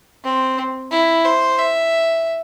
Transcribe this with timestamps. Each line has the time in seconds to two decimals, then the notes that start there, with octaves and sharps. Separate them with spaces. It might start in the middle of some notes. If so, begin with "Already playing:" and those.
0.24 C4
0.91 E4
1.25 C5
1.58 E5